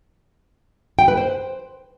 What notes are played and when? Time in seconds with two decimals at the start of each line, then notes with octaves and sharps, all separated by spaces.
0.99 G5
1.08 B4
1.17 C5